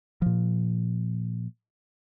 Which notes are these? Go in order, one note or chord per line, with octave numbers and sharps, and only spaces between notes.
A#2 F3